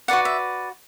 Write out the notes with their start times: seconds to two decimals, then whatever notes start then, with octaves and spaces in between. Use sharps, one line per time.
0.08 F#4 B4 D5 F#5
0.25 E5